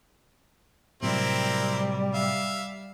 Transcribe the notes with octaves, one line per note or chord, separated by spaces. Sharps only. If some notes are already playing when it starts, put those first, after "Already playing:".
A2 C3 F#3 G3 C4 E4 A#4
E5 F5